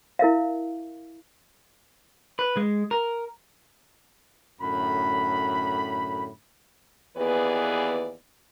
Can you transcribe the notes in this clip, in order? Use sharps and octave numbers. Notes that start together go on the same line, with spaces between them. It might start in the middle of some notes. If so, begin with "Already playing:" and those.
E4 A#4 E5 F5
B4
G#3
A#4
F#2 A2 D3 B5
D#2 E3 B3 G#4 B4 D5